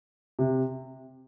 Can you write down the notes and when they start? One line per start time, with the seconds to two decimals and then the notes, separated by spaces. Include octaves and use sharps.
0.39 C3